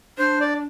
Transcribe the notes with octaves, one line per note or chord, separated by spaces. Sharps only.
D4 C5
D5